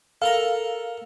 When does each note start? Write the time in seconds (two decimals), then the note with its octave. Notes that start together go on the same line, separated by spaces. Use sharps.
0.22 A4 A#4 F5 A#5